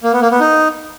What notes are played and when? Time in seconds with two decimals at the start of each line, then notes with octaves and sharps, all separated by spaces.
0.03 A#3
0.13 B3
0.22 A#3
0.31 B3
0.40 D#4